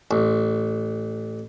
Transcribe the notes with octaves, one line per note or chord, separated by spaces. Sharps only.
A1